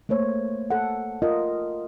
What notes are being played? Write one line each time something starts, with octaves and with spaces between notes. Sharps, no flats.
A3 A#3 C5 C#5
A4 F#5
F4 A#4 D#5